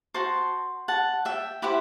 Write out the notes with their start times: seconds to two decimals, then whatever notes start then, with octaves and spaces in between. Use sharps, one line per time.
0.14 F#4 C5 A5 C6
0.88 F#5 A5
1.25 E5 G5
1.62 E4 G4 C5 F#5